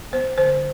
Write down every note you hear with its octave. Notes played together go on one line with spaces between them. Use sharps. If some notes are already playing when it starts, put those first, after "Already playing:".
B3 C5
D3 C5